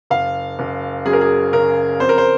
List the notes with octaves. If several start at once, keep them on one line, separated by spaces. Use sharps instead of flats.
F#1 F5
F#1
F#2 G#4
A#4
G#4
C#3 A#4
F2 C5
A#4
C5